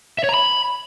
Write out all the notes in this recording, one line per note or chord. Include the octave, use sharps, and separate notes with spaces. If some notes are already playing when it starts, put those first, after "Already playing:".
E5
C#5
A#5
B5